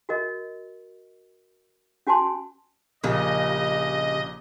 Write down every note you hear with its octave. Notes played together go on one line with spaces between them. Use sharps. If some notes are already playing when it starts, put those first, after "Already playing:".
F#4 A#4 D#5
C#4 F#4 G#5 A5 C6
A#1 C#3 A#3 G4 D#5